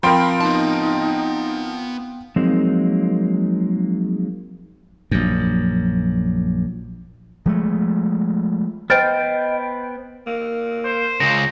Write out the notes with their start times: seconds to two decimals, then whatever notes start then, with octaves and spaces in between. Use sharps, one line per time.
0.03 F3 C4 A#4 F5 G5 B5 C6
0.41 B3 D#4 A5
2.36 F3 F#3 G#3 A#3 C4 D#4
5.11 A#1 F#2
7.46 F3 G#3 A3
8.90 B3 C5 D#5 G5 F6 A6
10.27 A#3
10.85 C5
11.20 C#2 C#3 A#6